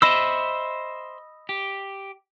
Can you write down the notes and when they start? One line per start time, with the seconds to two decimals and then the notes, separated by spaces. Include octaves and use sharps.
0.02 C5 D#5 E5 B5 E6
1.49 G4